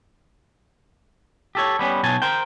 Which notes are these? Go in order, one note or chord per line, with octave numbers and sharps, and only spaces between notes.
G4 A4 C#5
G3 B3 C#4
B1 B2 C#5 G#5 A5
A#4 C5 G5